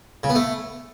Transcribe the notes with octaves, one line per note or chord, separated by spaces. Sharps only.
C#3
B3
A3